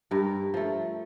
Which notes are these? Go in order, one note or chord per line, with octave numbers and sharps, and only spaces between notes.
G2 A#4
F3 A3